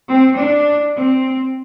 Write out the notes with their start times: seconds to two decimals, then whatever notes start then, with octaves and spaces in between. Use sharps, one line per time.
0.11 C4
0.39 D4
0.96 C4